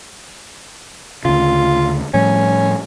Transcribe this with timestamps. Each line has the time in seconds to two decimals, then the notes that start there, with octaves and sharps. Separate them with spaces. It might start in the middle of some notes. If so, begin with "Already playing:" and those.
1.25 D2 C#3 F4
2.14 A2 F3 G3 C#4